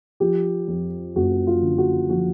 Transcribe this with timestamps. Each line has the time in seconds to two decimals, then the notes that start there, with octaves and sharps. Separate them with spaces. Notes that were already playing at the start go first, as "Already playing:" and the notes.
0.20 F3 G4
0.68 F2
1.15 F#1 F#4
1.47 F4
1.62 D3
1.78 F#4
2.10 F3 F#4